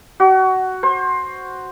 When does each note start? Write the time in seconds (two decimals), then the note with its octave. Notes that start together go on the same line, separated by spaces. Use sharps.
0.20 F#4
0.83 C5